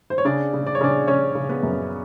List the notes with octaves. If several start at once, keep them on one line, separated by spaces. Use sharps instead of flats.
C5
C#5
C#3 D4 D5
C#3
D5
C#5
C#3 D4 D5
C#3 C#4 C#5
C#3
B3 B4
F#2